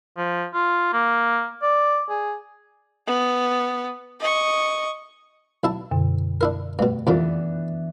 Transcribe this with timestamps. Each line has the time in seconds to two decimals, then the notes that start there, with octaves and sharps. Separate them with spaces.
0.17 F3
0.54 F4
0.93 A#3
1.62 D5
2.10 G#4
3.07 B3
4.20 D#5 C#6
5.64 B1 E4 A5
5.91 F#2 B2 D3
6.41 D4 E4 A#4
6.79 G2 B2 A3
7.07 C2 F2 A#2 E3 B3 D4